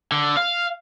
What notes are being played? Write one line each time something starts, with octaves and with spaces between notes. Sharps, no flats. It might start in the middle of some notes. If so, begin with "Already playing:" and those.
D3
F5